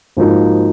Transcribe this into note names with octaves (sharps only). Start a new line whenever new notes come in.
G#2 F3 A#3 D#4 F#4